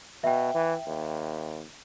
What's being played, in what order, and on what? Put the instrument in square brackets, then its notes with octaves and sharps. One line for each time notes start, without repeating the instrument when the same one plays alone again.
[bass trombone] B2 [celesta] E5 G5
[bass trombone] E3
D#2